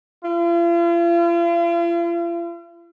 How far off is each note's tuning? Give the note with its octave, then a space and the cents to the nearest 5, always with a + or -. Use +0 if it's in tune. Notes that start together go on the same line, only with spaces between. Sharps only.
F4 -45